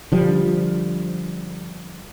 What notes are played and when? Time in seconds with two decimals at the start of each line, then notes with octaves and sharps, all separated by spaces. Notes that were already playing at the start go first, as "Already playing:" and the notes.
0.12 D3 F3 G3